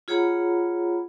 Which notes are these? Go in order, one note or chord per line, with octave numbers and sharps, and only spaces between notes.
F4 G#4 C#5 F#5 A#5 B5